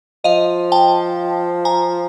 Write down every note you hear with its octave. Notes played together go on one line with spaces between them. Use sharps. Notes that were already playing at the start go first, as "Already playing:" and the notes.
F3 D#5 F5
G5 A5
G#5 A#5